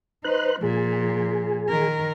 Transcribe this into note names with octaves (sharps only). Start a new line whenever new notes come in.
D#4 B4 C5 F#6
A#2 F3 G#4
D#3 A#4